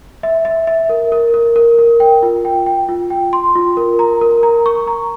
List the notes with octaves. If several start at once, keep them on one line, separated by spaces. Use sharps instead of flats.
E5
E5
E5
A#4
A#4
A#4
A#4
A#4
G5
F4
G5
G5
F4
G5
C6
F4
A#4
A#5
A#4
A#5
C#6
A#5